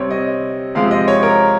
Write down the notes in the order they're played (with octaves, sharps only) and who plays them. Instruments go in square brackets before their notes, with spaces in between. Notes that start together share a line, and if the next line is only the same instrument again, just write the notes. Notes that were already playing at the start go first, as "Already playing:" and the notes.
Already playing: [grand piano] C3 G3 C4 C#5
D#5
C3 F3 G#3 C4 F5
D#5
C#5
A#4